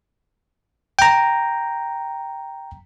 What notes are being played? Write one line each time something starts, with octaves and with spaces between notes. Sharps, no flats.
G5 A#5